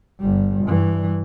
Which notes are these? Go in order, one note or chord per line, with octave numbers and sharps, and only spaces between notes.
G1 G3
G2 E3